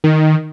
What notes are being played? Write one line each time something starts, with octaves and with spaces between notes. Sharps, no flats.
D#3